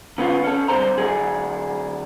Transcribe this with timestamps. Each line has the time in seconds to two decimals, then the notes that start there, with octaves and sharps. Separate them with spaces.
0.18 D3 B3 C#4 F4
0.44 C#4 A4
0.68 G2 D3 C4 C5 A#5
0.98 D3 F#3 G#4